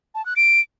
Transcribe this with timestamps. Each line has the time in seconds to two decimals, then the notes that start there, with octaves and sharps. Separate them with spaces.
0.15 A5
0.25 F#6
0.36 D7